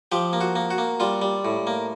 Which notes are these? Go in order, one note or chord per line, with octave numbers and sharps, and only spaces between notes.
F3 G4
A#3
F#4
A#3
F#4
A#3
G3 F4
G3
A2
A#3